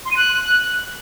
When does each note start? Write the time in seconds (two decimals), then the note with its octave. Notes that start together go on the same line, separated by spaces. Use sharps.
0.05 C6
0.11 D#7
0.17 F#6